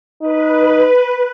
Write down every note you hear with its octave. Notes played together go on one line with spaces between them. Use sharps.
D#4 B4